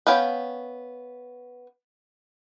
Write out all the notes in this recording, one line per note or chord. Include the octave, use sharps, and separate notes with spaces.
B3 C#4 F5 G5